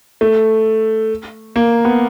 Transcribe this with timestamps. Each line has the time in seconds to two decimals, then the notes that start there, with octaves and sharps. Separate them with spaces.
0.21 A3
1.56 A#3
1.85 B3